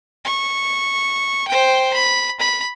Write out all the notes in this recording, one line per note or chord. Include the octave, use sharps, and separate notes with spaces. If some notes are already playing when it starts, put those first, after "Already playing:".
C#6
C5 G5
B5
B5